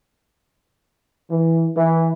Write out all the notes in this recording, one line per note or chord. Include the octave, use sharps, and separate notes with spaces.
E3
E3